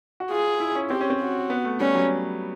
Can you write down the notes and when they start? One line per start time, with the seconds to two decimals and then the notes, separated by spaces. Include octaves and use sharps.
0.20 F#4
0.31 F4 G#4
0.60 E4
0.75 C#4
0.90 C4 G4
1.01 C#4
1.10 C4
1.20 F#4
1.50 B3
1.64 A3
1.80 G3 C#4
1.95 F#3